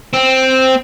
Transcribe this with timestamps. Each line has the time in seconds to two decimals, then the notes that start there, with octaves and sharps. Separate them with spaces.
0.14 C4